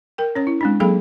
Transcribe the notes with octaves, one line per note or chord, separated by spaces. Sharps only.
A#4 G5
C#4 C#5
E4
G#3 C4 D4
F#3 A#3 G#4 A4 F5 B5